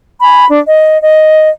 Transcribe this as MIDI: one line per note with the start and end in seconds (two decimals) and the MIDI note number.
0.21 0.46 80
0.21 0.46 83
0.48 0.60 62
0.66 1.00 75
1.01 1.47 75